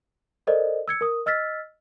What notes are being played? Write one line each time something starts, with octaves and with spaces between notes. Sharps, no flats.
A4 A#4 C5 D5 D#5
E6 G#6 C#7
A#4 D#6
D#5 E6 F6 A6 B6